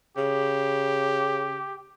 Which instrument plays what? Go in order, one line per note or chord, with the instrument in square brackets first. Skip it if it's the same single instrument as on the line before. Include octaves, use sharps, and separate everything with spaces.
[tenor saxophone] C#3 [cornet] G4